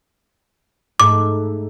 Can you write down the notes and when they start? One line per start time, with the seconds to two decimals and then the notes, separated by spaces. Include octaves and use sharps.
1.00 G#2 A3 D6